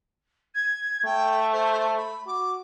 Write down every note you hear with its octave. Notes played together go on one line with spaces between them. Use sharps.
G#6
A3 G5
C5
B5
F#4 D6